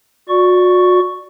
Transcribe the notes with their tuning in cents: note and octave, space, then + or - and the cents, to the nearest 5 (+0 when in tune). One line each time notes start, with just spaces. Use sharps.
F#4 -35 D5 +0 C#6 +0